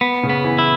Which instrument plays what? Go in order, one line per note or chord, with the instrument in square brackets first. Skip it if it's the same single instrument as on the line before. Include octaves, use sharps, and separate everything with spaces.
[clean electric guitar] B3
[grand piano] C#3
[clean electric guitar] B3
[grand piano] E3
[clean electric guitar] E4